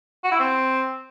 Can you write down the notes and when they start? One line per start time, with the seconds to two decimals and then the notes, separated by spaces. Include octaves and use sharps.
0.24 F#4
0.32 E4
0.39 C4